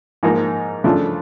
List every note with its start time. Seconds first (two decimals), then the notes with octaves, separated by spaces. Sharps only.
0.23 G#2 F3 A#3 D#4
0.84 C#3 F3 A3 D4 F4